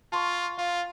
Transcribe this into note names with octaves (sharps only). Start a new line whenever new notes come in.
F4 A5 C6 C#6
F4 F5